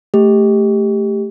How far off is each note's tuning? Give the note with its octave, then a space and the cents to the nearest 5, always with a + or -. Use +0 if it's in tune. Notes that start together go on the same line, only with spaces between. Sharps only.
A3 +0 G4 +15